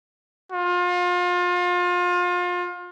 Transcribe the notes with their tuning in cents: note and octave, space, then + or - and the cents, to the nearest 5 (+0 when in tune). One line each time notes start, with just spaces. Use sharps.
F4 +30